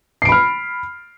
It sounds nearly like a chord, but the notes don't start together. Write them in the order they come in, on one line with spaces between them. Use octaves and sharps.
C7 D7 B5 F6